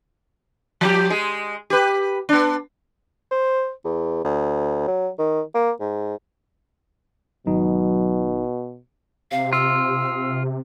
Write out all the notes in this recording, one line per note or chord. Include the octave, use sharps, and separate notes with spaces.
F3 G4
G#3 G#4
G4 B4
B3 D4
C5
E2
D2
F#3
D#3
A#3
G#2
G#1 B2 F#3 D#4
C3 F5
F4 E6